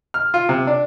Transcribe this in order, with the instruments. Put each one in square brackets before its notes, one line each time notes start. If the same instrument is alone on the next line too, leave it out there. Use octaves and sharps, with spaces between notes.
[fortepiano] F6
F4
C3
D4